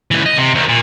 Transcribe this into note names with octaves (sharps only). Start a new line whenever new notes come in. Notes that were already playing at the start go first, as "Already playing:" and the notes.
C#2 E3
D#5
C3
D2 D#3
A#2